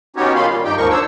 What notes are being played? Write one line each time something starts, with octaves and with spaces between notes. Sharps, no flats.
B3 C#4 D#4 F#4 G4 C#5
D#3 C#4 F4 F5 B5 C6
A#2 G3
G2 D#4 G4 G5
D#2 G#2 F3 A#3 A#4 C#6
D4 C5 C#5 E6